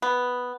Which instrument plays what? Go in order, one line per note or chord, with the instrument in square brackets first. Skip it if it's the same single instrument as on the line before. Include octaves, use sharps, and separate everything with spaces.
[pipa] B3